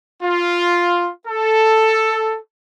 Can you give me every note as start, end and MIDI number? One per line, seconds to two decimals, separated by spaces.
0.22 1.10 65
1.28 2.39 69